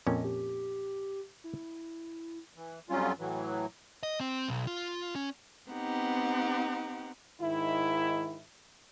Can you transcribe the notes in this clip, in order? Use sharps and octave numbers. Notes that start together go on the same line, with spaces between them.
F2 A#2 C#4 D#5
G4
E4
E3
F2 F#3 G3 C#4 F4
A2 E3 F#3
D#5
C4
B1
F4
C#4
B3 C4 D#4 G4 F#5
G#2 D#3 E4